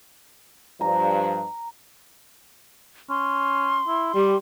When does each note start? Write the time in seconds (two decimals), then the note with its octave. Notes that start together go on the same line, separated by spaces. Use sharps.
0.81 G2 F3 A#5
3.10 C#4 C6
3.88 E4
4.15 G3 G4